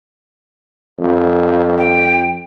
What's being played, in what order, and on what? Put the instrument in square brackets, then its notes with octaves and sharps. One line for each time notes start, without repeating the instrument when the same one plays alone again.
[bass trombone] F2
[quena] G5